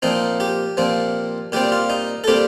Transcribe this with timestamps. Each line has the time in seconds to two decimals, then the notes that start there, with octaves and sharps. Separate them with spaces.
0.02 A#2 F3 C4 D#4
0.40 G4
0.77 A#2 F3 C4
1.52 A#2 G3 C4 G4
1.72 F4
1.90 D#4
2.24 A4
2.28 A#2 G3 C4 G4